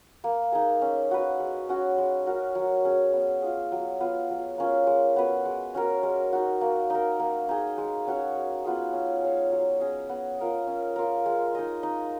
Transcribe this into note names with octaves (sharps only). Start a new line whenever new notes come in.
A#3
D#4 G#4
C#4
F#4 B4
G#3
C#4 F#4
G#3
C#4 F#4 A#4
F#3
C#4 G#4
B3
F4 G#4
F#3
B3 F4
F#3
A#3 C#4 F4
G#3
B3 F#4 B4
G#3
C#4 F#4 A#4
G#3
D#4 F#4
A#3
D#4
A#4
A#3
D#4 G#4
G#3
C#4 F#4 C#5
G#3
B3 F4 G#4
C#4
G#4 C#5 F5
F#3
C#4 G#4 D#5
B3
F4 A#4 D#5
C#4
F4 A#4
G#3
D#4 G#4 D#5
D#4